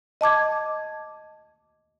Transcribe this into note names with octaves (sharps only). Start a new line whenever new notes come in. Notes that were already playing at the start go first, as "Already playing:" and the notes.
D#5 A5 D6 G#6